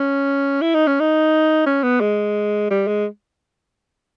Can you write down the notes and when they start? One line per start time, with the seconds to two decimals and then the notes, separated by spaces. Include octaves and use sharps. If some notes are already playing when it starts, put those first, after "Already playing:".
Already playing: C#4
0.61 E4
0.74 D#4
0.87 C#4
1.00 D#4
1.66 C#4
1.83 B3
2.00 G#3
2.70 G3
2.87 G#3